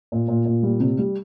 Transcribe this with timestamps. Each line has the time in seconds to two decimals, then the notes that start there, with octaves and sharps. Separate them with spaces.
0.12 A#2
0.28 A#2
0.45 A#2
0.63 G3
0.80 C3
0.98 G3